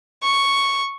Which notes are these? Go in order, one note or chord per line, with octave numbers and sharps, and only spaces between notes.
C#6